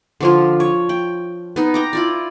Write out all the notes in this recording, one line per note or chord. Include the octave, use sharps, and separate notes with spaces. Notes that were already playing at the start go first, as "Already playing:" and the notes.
D3 F3 F4
C#5
G5
B3 D#4
G5 A#5 D6
E4 F4 D5